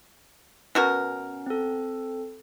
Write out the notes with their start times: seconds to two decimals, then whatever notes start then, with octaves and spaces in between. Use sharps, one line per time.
0.75 B2 C#4 F#4 A#4
1.46 C4 A4